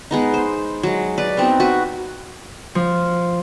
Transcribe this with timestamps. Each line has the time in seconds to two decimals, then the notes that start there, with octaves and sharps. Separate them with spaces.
0.11 G#3 B3 D#4
0.34 C5
0.83 F#3 G#3
1.18 B4 D5
1.37 B3 C4 D#4 F#4
1.60 F#4 B4
2.75 F3